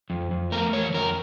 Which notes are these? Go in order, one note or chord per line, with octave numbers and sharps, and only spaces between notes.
F2
F2
A3 A#4
E3 C#5
F2 A#4